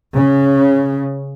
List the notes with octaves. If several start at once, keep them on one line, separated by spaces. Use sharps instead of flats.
C#3